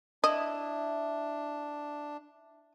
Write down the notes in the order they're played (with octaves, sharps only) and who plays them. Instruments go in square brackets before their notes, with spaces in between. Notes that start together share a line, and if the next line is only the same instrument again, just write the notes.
[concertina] D4 [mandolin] E4 [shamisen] D#5